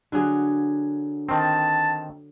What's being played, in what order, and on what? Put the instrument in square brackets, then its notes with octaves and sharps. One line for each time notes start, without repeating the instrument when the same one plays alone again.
[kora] D3 F#3 G#4
[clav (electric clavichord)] D#3 C4 [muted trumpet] A5